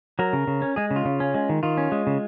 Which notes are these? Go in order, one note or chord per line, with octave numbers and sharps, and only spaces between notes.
F#3 A#4
C#3
C#3
C#4
G#3 G#4
C#3
F4
C#3
C#4
G#3
D#3
D#3 F4
C#4
G#3
C#3